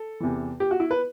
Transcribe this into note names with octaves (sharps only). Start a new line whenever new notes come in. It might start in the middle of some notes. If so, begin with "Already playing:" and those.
Already playing: A4
E2 C3 E3
G4
F#4
E4
B4